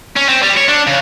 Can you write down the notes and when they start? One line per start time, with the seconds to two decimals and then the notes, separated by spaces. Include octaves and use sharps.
0.17 C#4
0.29 C4
0.43 G3
0.57 C#5
0.68 D4
0.87 C#3